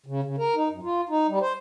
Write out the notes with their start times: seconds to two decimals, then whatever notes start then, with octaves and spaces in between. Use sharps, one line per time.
0.06 C#3
0.23 C#3
0.38 A#4
0.55 D#4
0.69 F#2
0.83 F4
1.09 D#4
1.28 G3
1.41 C5